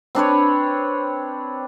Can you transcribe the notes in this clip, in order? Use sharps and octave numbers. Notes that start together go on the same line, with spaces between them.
C4 D4 B4 C#5